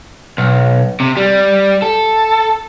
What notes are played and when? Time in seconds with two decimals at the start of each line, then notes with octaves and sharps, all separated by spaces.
0.38 B1
1.00 C3
1.17 G3
1.82 A4